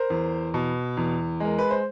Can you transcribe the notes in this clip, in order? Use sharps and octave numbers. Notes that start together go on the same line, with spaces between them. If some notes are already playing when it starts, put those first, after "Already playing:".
Already playing: A#4 C5
E2
B2
E2
G#3 A#4
B4
C5